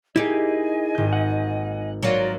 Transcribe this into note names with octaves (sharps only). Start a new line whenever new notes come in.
A#3 D#4 E4 G4 G#4 D#5 G#5
G#1 G6
F#5
F#3 A#3 F4 A#4 D5